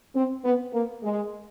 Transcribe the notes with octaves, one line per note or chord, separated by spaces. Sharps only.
C4
B3
A#3
G#3